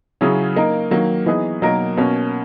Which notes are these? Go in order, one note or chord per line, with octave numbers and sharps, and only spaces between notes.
C#3 F#3 C#4 E4 G#4
A#3 D#4 A#4
D#3 F#3 A#3
E3 B3 D#4 G#4
B2 F#3 A#3 D#4 A#4
B2 A#3 C#4